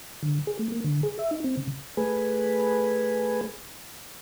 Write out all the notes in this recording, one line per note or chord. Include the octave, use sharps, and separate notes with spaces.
D3
G#4
A3
A#3
D3
G#4
E5
D#4
C4
C#3
A3 G#4 B4